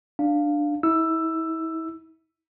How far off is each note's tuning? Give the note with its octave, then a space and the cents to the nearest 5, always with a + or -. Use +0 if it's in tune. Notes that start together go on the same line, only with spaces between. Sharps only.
D4 +10 F5 +0
E4 -35 E6 +10